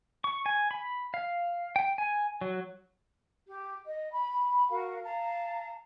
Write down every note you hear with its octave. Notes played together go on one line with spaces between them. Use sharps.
C#6
G#5
B5
F5
G5
G#5
F#3
G4
D#5
B5
F#4 A#4 F5
F5 A5 A#5